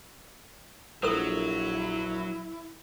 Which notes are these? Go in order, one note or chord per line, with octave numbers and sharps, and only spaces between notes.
A#1 F#3 E4 A4 A#4 E6